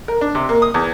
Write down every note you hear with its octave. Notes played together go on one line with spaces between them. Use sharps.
A#4
D4
C3
A#3
D#6
E2